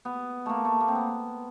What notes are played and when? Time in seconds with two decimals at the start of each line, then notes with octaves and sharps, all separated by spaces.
0.05 B3
0.46 A3 A#3
0.65 A3
0.80 A#3
0.88 C4
0.95 B3